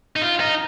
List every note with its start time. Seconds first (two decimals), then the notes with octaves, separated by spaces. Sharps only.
0.16 D#4
0.22 F4
0.40 D#4